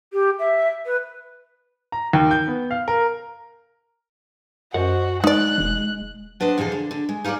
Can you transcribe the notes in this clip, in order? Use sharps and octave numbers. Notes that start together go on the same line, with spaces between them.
G4
E5
B4
A#5
D#2
G6
B3
F5
A#4
F#2 F#4 C5 D#5 F#5
G#3 D#4 D5 F#6
E1
F#3 D4 B4 C5 D#5
F2 C3 E3 G#4 A4
D3
D3
G#3
D#4 F4 G#4 C5 D5